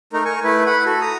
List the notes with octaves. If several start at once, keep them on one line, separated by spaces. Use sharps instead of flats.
A3 D#4 A#4
A#4 G#5 C#6
A3 E4 B4
F#5 B5
F#4 A4
A#5 D#6